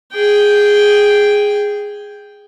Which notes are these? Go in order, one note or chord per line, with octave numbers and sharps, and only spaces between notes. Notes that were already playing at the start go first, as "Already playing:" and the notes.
G#4 G5